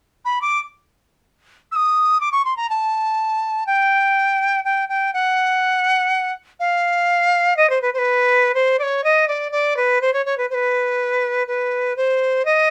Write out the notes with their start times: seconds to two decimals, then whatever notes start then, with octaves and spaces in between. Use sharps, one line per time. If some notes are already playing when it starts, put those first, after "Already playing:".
0.25 B5
0.42 D6
1.72 E6
1.76 D#6
2.21 D6
2.32 C#6
2.45 C6
2.57 A#5
2.70 A5
3.67 G5
4.65 G5
4.89 G5
5.13 F#5
6.60 F5
7.57 D#5
7.70 C5
7.82 B4
7.94 C5
7.98 B4
8.54 C5
8.79 D5
8.83 C#5
9.04 D#5
9.28 D5
9.52 D5
9.77 B4
10.01 C5
10.13 C#5
10.26 C#5
10.38 B4
10.50 C5
10.54 B4
11.47 B4
11.96 C5
12.45 D#5